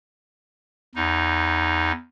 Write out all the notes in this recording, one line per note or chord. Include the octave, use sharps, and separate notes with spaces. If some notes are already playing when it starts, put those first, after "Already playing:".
E2 D#4